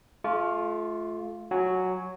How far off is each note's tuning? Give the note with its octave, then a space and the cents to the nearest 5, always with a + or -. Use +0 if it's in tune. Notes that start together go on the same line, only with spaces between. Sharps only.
A3 -35 F4 +0 C#6 +45
F#3 +0 F#4 +0 G#5 +15